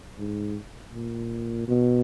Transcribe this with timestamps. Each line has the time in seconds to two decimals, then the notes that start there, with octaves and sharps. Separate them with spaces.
0.18 G#2
0.93 A#2
1.68 B2